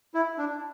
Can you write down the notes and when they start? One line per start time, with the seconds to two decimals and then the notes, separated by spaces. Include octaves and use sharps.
0.14 E4
0.38 D4